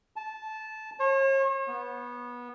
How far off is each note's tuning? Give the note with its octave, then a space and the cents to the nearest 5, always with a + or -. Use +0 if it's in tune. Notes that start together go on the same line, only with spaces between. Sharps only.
A5 -15
C#5 -40
B3 -20